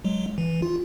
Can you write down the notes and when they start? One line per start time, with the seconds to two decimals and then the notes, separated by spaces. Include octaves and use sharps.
0.04 F#3 G#3
0.38 E3
0.62 F4